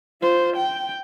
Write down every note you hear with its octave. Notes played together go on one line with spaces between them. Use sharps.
F4 C5
G5